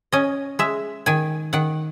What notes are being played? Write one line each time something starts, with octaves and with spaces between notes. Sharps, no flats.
C#4 D#5
G#3 E5
D#3 G#5
D#3 F#5